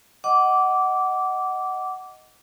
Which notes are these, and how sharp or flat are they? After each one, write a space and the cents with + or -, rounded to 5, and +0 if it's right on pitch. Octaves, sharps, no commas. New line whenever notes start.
D#5 +0 F#5 +15 D6 -15